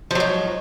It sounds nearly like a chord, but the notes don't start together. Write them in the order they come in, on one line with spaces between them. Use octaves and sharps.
F3 F#3 G#2